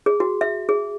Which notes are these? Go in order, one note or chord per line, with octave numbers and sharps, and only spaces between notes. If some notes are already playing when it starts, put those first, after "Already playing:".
G#4
F#4
E5
G#4